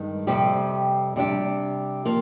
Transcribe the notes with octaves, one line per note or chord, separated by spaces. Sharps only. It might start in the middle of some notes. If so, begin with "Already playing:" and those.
Already playing: G2 D#3 G#3
F2 C3 G3 C4 G4
C3 G3 D4 G4
F3 A#3